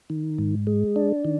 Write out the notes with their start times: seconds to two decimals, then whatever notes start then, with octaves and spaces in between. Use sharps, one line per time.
0.10 D#3
0.38 G#2
0.67 G#3
0.96 D4
1.25 D#3